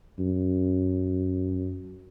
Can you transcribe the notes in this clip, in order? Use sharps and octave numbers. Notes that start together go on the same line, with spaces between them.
F#2